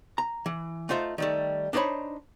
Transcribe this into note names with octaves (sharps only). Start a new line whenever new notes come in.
A#5
E3
A3 D#4 F4 C5 E5
D#3 G3 A3
D4 D#4 A4 C5 C#5 B5